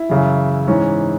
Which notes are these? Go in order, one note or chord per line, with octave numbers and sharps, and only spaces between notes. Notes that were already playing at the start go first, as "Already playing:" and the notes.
Already playing: E4
F#2 C#3 E3
G#2 E3 C#4